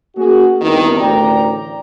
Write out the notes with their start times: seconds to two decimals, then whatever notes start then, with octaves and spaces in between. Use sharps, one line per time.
0.16 A#3 C#4 F#4 G#4
0.62 E2 G2 C3 D#3
0.97 A1 D2 A#4 D5 G5 A#5